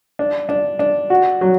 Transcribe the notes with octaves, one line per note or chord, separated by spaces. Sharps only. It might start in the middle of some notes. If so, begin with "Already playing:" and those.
D4
D4
D4
F#4
F#3